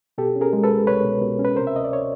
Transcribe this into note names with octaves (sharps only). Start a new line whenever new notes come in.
B2 G4 A4
C#4
G#4 A#4
G#3
A4 B4
C2
C2 B4 C#5
B2
B2
C#4
B4
C3 A#4 C5
E5
D2 D#5
D5
C#5